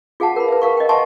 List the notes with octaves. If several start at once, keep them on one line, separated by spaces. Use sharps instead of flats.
F4 G#4 F5 F#5 A5
A#4 B4 B5
B4 E5
A#4 F5 C#6
D#5 G5
E5 F#5 G#5 A5 C6 C#6